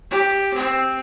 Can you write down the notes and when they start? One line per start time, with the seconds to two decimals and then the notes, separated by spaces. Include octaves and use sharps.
0.11 G4
0.54 C4